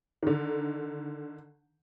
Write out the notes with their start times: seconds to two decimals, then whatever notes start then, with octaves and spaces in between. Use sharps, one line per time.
0.23 D3 D#3